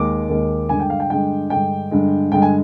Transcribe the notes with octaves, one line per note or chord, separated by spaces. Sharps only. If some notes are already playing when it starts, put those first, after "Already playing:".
Already playing: D#2 D#3 G#3 D6
D#2 D#3 G#3
G2 D3 G#3 G#5
G5
F5
G5
G2 D3 G#3 G5
G2 D3 G#3 G5
G2 D3 G#3
G2 D3 G#3 G5
G#5